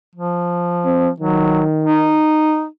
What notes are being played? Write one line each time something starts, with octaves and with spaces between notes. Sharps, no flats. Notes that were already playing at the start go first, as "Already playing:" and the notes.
F3
C4
D#3 F#3
D#4